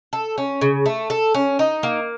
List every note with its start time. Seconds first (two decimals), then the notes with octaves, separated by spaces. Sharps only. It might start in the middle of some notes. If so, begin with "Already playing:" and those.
0.13 A4
0.38 C#4
0.61 C#3
0.86 A3
1.10 A4
1.34 C#4
1.59 D#4
1.83 A#3